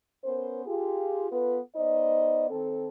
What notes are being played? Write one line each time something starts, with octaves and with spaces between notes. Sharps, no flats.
B3 C#4 A#4 C5
F4 G4 G#4
B3 F4 A4 B4
B3 D#4 C5 D5 D#5
D#3 C4 A4